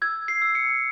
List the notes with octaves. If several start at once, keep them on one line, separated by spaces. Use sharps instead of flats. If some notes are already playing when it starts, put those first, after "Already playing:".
E6 G#6
C7
E6
C#7